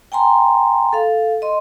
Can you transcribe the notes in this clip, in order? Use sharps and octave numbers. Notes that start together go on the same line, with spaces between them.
G5 G#5 A#5 C6
A4 F5
D#5 C6